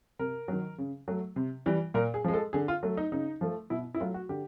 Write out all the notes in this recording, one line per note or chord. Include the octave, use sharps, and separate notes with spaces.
C3 A#4
D#3 F#3
C#3
F#3 A3
C3
E3 G3
A#2 A#4
G#4
F3 G#3
A4
D3 G#4
F4
F#3 A3
D#4
C#3 D#4
F3 A3
B2 E4
E4
F#3 A3 F4
F#4
D3 G4